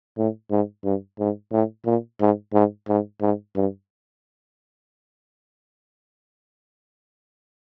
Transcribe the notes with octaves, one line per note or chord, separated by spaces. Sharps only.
A2
G#2
G2
G#2
A2
A#2
G#2
G#2
G#2
G#2
G2